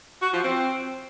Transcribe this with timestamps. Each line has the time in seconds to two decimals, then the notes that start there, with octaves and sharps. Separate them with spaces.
0.21 F#4
0.33 F3
0.44 C4